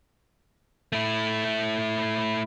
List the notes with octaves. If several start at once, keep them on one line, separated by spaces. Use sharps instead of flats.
A3 E4